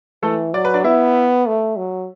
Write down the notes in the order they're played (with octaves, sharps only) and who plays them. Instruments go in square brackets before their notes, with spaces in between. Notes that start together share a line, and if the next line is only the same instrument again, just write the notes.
[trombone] E3 [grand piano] A3 A4
[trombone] F#3 [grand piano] D5
[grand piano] B4
D4 D5
[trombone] B3 [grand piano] E4 E5
[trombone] A3
F#3